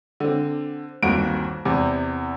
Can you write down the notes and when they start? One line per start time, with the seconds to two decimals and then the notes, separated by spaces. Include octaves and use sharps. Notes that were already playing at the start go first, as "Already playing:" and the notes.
0.20 D3 C4
1.02 G1 D#2 C4 F#4 D7
1.65 E2 C3